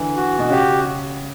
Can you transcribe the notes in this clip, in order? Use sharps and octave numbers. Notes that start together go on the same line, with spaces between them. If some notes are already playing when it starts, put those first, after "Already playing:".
Already playing: D3 E3
F#4
B2
C#3 G4